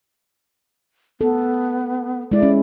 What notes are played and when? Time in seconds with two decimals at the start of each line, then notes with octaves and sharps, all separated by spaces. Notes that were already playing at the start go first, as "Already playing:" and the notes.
1.21 B3 A4
2.32 G#3 E4 D5
2.43 C#4